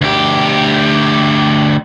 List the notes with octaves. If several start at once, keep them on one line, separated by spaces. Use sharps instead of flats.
D2 G4